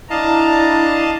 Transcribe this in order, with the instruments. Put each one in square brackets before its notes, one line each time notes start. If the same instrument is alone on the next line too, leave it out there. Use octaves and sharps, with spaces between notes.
[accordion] D4 [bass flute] E4 [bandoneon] D#5 F5 A5 [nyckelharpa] A#5